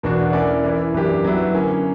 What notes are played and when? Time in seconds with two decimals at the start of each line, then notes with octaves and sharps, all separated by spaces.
0.03 E2 B2 A#3 D4 F#4
0.33 A#3 C#4 E4 A#4 D5
0.63 E3 A#3 E4
0.94 F#2 E3 A#3 D4 G4
1.24 F#3 B3 E4
1.53 D3 A#3 C#4